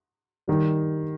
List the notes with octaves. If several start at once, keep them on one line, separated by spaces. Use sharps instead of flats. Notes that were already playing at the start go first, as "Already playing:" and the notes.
D#3 G3